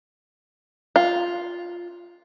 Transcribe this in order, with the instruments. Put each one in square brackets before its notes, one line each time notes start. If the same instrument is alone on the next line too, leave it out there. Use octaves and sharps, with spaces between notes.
[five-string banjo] F4